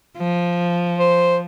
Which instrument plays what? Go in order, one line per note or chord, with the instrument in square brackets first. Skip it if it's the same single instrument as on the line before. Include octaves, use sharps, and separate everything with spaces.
[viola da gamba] F3
[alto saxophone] C5